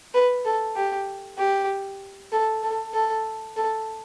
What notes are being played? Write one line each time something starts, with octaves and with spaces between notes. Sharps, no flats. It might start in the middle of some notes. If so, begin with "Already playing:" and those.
B4
A4
G4
G4
A4
A4
A4
A4